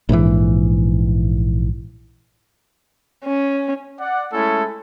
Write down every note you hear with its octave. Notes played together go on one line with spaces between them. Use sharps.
A#1 G#2 C3 E3
C#4
D5 F#5
G#3 A3 C#4 E4 A4